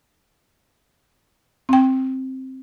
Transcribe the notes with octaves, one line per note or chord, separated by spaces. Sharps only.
C4 G5